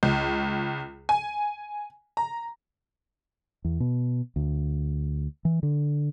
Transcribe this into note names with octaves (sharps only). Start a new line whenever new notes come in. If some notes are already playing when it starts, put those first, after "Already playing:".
C#2
G#5
A#5
E2
B2
D2
E3
D3